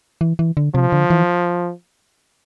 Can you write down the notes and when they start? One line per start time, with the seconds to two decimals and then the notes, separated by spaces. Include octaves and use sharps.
0.21 E3
0.39 E3
0.57 D3
0.74 C3 F3
0.92 D3
1.10 E3